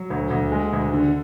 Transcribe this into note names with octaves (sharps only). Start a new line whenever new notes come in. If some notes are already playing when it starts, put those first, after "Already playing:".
Already playing: F#3
D2
D2
G#3
D2
D3